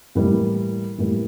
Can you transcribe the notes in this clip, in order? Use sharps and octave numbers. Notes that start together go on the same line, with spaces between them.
A2 E3 G3 A#3
A2 E3 G3 A#3